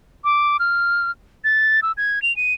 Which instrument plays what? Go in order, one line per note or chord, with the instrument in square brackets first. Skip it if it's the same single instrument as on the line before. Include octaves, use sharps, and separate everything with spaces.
[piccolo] D6
F6
A6
E6
G#6
F7
D#7